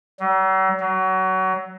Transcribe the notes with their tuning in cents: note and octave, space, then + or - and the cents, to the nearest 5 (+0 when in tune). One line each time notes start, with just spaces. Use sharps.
F#3 +45
F#3 +25